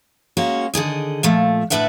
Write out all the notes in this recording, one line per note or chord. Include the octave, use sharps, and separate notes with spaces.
G#3 A#3 C#4 F#4
D3 D#3 G#4 D#5
A#2 F3 A3
D2 A2 D4 B4 E5 F#5